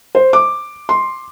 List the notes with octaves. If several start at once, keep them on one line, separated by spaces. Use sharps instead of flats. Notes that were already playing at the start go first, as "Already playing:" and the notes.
C5
D6
C6